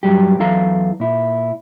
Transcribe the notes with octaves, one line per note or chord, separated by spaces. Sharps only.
G2 F#3 G3 G4
E2 F#3 E4 A4 F5 A#5
A#2 E4